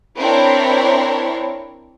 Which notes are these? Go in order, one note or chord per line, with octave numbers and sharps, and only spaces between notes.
C4 D4 E4 A#4 C#5